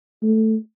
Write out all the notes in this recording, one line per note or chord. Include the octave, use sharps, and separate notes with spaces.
A3